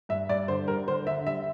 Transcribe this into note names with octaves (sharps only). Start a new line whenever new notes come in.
G2 E5
G2 D5
D3 C5
G3 A#4
D3 C5
D3 E5
G3 E5